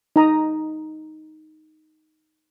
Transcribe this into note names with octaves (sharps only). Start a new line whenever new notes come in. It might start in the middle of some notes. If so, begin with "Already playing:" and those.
D#4 A#5 D#6